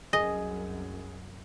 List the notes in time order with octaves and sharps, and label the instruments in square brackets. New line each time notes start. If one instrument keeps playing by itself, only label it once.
[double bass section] C2 F#2 [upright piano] G#4 G#5 [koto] D#5